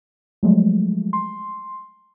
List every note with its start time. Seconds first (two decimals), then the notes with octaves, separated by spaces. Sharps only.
0.43 F3 F#3 G#3 A3
1.13 C6